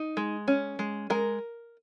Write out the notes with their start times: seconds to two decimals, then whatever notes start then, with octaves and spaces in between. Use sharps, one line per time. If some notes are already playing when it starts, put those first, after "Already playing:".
Already playing: D#4
0.17 G#3
0.48 C#4
0.79 G#3
1.10 G#3 A#4